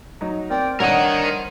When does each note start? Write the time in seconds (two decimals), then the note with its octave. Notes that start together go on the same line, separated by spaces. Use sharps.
0.21 F#3 D#4
0.50 C4 A#4 D5 G5
0.80 G2 D4 A#4 C#5 D#5 F#5 F6
1.25 C5